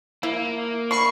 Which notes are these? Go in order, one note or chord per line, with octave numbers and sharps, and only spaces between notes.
A#3 E4
D3 B5 C#6 C7